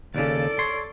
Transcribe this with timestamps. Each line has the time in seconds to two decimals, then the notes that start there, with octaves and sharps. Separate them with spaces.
0.15 D#2 C#3 A4 D5
0.59 C#5 C6